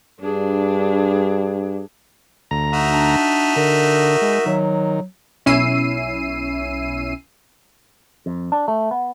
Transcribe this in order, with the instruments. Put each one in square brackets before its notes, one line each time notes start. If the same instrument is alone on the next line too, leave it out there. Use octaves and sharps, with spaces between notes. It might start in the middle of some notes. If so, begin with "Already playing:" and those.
[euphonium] G2 [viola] D4 G#4
[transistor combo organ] D2 A#5
[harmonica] D#4 F#4 E5
[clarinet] D4
[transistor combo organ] D3 [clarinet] A#4
[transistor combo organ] G#3
[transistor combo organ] D#3 [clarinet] F#3
[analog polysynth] B1 C#4 E4 E6 C7 D#7
[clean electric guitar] F2
D4
A3
B3